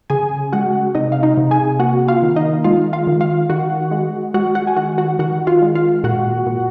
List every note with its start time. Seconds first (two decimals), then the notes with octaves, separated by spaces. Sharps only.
0.10 C#3 G#4 G#5
0.52 G#3 F#4 F#5
0.95 C3 D#4 D#5
1.12 F5
1.23 D#4 D#5
1.37 C3
1.51 G#4 G#5
1.79 A#3 F#4 F#5
2.08 F4 F5
2.22 D#3
2.36 D#4 D#5
2.64 G#3 F4 F5
2.93 F4 F5
3.07 D#3
3.21 F4 F5
3.50 D#3 F#4 F#5
3.91 G#3
4.34 G#3 F#4 F#5
4.55 F#4 F#5
4.67 G#5
4.76 D#3 F#4 F#5
4.98 F#4 F#5
5.19 D#3 F#4 F#5
5.47 F4 F5
5.62 G#3
5.75 F4 F5
6.04 A#2 F#4 F#5
6.47 A#2